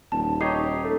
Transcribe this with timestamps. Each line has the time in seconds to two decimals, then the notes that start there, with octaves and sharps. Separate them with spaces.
0.12 D#1 A5
0.41 D#4 G4 C#5 C7
0.85 A3